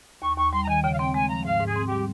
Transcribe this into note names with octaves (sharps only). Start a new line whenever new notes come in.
D#2 C#6
D#2 C#6
G3 C6
A#5
D#3 G#5
C#3 G5
F5
C4 G5
G#3 G#5
F3 A#5
G#2 F5
G#2
G#4
C4
G4
G3